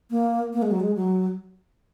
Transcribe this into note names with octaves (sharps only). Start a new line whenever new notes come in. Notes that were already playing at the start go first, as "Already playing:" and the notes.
A#3
A#3
G#3
F#3
G#3
F#3